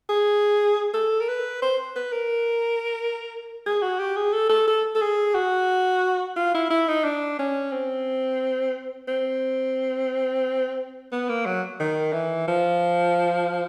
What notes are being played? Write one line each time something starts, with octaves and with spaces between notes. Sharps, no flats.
G#4
A4
A#4
B4
C5
B4
A#4
G#4
F#4
G4
G#4
A4
A4
A4
A4
G#4
F#4
F4
E4
E4
D#4
D4
C#4
C4
C4
B3
A#3
F#3
D#3
E3
F3